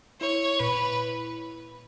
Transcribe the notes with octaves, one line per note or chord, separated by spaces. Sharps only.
E4 C#5
A#2 B4